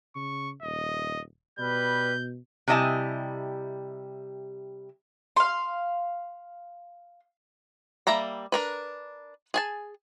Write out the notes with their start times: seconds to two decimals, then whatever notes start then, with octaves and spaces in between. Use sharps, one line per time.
0.16 C#3 C#6
0.63 D#1 D#5
1.59 B2 G3 B4 G6
2.68 C3 G3 E4 D#5 G#5 A5
5.37 F5 C6
8.07 G3 A#3 E5 A#5 B5
8.52 D4 A#4 B4
9.54 G#4 G#5 A5